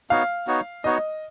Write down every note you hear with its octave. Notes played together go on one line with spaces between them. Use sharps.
B3 D#4 F#4 C#5 F5
B3 D#4 F#4 C#5
B3 D#4 F#4 C#5 D#5